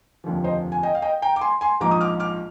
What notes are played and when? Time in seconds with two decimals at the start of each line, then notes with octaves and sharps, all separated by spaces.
0.24 F1 D#2 D3 F3
0.44 C5 D#5
0.72 G#5
0.83 D#5 G5
0.95 F5
1.02 D#5 G5
1.22 G5 A#5
1.36 D6
1.41 G#5 C6
1.61 G#5 C6
1.81 A#1 G#2 F3 A#5 D6
1.91 D#6
2.01 D6 F6
2.20 D6 F6